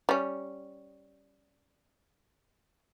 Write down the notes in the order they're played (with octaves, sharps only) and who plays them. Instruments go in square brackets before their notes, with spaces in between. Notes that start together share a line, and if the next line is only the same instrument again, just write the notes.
[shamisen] G3 C#4